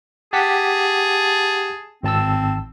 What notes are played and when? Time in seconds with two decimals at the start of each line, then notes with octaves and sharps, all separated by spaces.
0.33 G4 G#4 F#5 A5 B6
2.03 G#1 C4 A5 E6